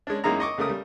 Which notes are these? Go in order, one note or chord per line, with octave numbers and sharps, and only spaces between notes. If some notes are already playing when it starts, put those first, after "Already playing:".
G#3 C#4 D4
F#2 G#3 A#3 D#4 E4 A#5
D#5 C#6 D6
C#2 C#3 A3 A#4 D#6
G3